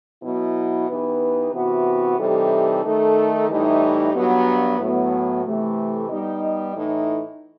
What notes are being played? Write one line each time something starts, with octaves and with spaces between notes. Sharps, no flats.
B2 F#3 B3 E4
E3 B3 D#4 G4 B4
C3 E3 B3 F#4
C3 E3 G3 D#4 A4
D#3 A3 D#4 A4
A2 E3 G3 D#4
G2 F#3 B3
A2 F#3 B3
C3 E3 A3
G3 B3 D#4 G4 D#5
A2 E3 A3 D#4